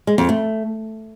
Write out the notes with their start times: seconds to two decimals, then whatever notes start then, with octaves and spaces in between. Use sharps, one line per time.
0.07 G#3
0.18 F2
0.29 A3